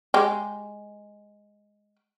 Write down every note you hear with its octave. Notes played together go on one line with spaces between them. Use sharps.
G#3 G4